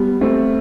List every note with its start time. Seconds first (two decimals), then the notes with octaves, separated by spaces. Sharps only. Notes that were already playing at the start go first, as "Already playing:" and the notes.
Already playing: G3 B3
0.21 A3 C4